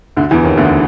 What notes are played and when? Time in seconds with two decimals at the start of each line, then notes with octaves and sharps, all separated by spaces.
0.17 D2 D3
0.31 E2 E3
0.44 D#2 D#3
0.57 D2 D3